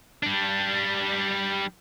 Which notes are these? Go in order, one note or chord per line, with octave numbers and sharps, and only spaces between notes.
G3 D4